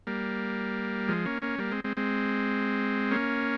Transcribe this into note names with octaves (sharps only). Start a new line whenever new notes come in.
G3 A#3
F3 G#3
A#3 C#4
A#3 C#4
G3 A#3
G#3 C4
G#3 C4
G#3 C4
A#3 C#4